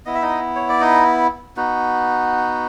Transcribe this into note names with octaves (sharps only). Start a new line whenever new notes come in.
B3 E4 D#5
E5
D#4 D#5
C#5
D5
D#4 D#5
B3 D#4 F#4